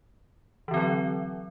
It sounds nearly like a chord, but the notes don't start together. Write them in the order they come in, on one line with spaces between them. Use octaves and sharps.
E3 D3 C4 F#3